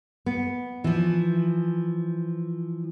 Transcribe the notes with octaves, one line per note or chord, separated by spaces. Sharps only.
B3
E3 F3